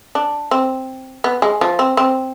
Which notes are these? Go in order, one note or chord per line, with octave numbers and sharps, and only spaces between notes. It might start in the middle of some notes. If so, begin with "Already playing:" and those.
D4
C4
B3
G#3
F3
C4
C4